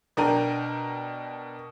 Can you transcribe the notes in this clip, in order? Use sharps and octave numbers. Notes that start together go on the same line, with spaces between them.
B2 D4 A#4 G5 D#7